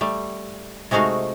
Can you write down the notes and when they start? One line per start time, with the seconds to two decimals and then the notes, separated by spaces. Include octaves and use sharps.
0.01 G3 A3
0.91 C3 G#3 A3 D#4 F#4 F5